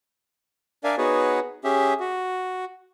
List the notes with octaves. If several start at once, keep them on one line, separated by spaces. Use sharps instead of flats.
D4 A#4 D5 E5 F5 G#5
B3 D#4 F#4 G#4 B4 C#5
C#4 G4 G#4 E5
F#4